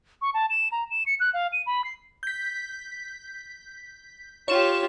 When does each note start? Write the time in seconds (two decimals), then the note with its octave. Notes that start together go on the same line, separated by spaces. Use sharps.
0.22 C#6
0.34 A5
0.50 E7
0.72 A#5
0.90 E7
1.06 C#7
1.20 F#6
1.33 F5
1.52 D#7
1.66 B5
1.84 C7
2.23 G6 B6
4.48 F4 G4 C#5 E7